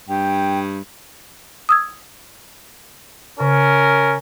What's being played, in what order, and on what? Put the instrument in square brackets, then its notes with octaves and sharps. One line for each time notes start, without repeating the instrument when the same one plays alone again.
[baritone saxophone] G2 [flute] G5
[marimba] D#6 E6 G#6
[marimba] C#3 [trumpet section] C#4 A#4